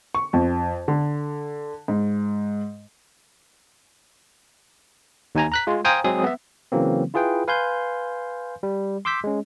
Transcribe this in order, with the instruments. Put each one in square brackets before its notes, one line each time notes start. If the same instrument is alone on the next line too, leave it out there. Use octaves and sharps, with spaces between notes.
[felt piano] C#6
F2
D3
G#2
[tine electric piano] D#2 D#4 G#5 A#5
A#5 F#6 B6
G#3 F4
C5 F5 G5 G#5 A#5 D#6
F#3 G#3 C4 G#4 D#6
B3 E5
C#3 E3 F#3 A#3 C4
E4 F4 G#4 B4 G5
B4 F5 G#5 C6 G6
G3
C6 D6 E6 G6 B6
G#3 C#4